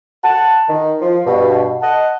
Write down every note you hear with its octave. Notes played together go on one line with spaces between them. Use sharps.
F#5 A5
D#3
F3
G2 B2
D#5 F#5 A5